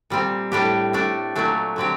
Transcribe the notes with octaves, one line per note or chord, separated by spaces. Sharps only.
A#2 G3 C4
A2 G3 D4 G4
A2 A3 D4
A#2 F#3 A3 D4
D3 F#3 C4 G4